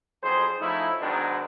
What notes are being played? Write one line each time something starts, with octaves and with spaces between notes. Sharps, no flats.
B1 F2 G#4 C5
F3 A3 C#4 D#4 E4
G#2 D#3 F#3 G#3 B3 D4